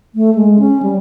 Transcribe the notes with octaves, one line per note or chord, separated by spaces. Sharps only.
A3
G#3
C#4
G3